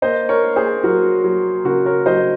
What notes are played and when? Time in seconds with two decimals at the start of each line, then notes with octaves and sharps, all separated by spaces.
0.02 A#3 C5 D#5
0.29 A#4 C#5
0.43 A#3
0.56 G#4 C5
0.84 F#3 F#4 A#4
1.24 F#3
1.65 C#3 F#4 A#4
1.86 A#4 C#5
2.06 F#3 C5 D#5